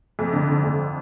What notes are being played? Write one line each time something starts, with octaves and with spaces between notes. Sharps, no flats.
F2
D3
D3
F2